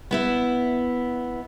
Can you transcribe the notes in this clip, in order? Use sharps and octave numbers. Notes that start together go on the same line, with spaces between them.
B3 E4 E5